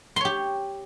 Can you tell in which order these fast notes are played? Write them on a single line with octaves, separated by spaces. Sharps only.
C6 C#5 G4